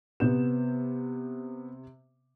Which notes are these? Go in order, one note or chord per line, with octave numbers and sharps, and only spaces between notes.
C3 B3 G6 E7